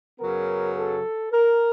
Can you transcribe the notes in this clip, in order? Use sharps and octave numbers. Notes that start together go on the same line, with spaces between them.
F#2 C#3 F#3 B3 A#4
A4
A#4